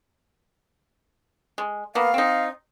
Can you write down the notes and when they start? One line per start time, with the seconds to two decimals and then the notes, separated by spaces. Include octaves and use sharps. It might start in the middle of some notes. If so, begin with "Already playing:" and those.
1.58 G#3
1.95 A#3 B3 F5
2.14 C4 D#4